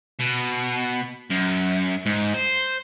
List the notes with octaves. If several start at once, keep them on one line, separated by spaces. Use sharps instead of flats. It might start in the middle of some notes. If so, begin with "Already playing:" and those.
B2
F#2
G#2
C5